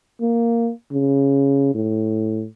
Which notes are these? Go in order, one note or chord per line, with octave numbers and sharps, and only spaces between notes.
A#3
C#3
A2